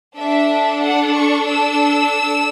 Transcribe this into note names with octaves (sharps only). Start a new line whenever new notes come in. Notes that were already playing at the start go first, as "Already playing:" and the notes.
D4 A4 E5
F#5
C#6
E6